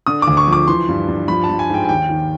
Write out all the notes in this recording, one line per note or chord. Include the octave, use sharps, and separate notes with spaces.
D3 D#6
D6
D2
C#6
F3
D6
E3 C6
G2
G2
F3 B5
A5
F3
G#5
G#2 G5
G#5
D#2 G5
D#3